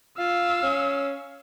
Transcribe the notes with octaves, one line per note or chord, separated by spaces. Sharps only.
F4 F5 E6
C#4